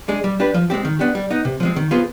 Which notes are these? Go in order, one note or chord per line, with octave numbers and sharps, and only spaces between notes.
G#3 D4 G#4
G3
D4 G4 B4
F3
G#3 C4 G4
D#3
B3 D4 G4
G3
B3 D#4
C3
F3 G#3 C4
D#3
B3 F4 G#4 C5